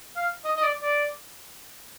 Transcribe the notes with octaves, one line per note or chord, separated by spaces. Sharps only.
F5
D#5
D#5
D5
D5